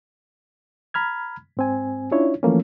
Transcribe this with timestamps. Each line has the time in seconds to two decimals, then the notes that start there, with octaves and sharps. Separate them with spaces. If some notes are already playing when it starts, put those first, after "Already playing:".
0.94 A#5 B5 F6 G#6
1.57 G#2 C4 G#5
2.11 C#4 D4 E4 F4 C#5
2.43 E3 F3 A3 A#3 C#4